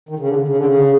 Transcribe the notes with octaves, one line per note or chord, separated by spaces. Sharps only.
D#3
C#3
D3
C#3
D3
C#3